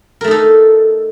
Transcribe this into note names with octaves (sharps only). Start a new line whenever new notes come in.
A3 D#4 A4 A#4